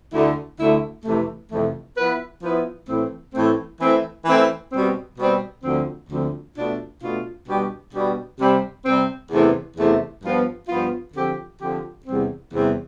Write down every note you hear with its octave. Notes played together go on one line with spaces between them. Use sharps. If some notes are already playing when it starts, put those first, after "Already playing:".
D2 D3 A3 E4
D2 D3 A3 E4
F2 C3 E3 A3
F2 C3 E3 A3
F3 B3 E4 B4
F3 B3 E4 B4
A2 E3 A3 C4
A2 E3 A3 C4
E3 A3 C4 E4
E3 A3 C4 E4
B2 G3 C4
B2 G3 C4
D2 D3 F3 C4
D2 D3 F3 C4
B2 A3 D4 F4
B2 A3 D4 F4
B2 G3 D4 G4
B2 G3 D4 G4
C3 G3 C4
C3 G3 C4
E2 C3 E3 A3
E2 C3 E3 A3
G2 F3 B3 F4
G2 F3 B3 F4
D3 F3 C4 G4
D3 F3 C4 G4
E2 C3 G3 C4
E2 C3 G3 C4